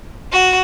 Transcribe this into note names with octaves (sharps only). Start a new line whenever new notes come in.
F#4